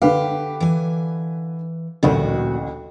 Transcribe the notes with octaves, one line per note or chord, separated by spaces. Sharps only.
D3 G4 B4 F5
E3 G#5
A1 D2 A#2 F#3 F#4